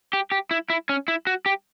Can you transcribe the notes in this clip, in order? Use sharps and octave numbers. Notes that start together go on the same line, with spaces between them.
G4
G4
E4
E4
C#4
E4
F#4
G4